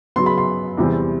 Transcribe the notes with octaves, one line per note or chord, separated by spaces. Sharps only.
C#3 F#3 B3 C6
B5
C6
E2 C3 E3 G3 C4